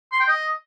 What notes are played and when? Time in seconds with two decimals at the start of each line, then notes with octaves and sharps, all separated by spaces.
0.12 C6
0.20 G5
0.28 D#5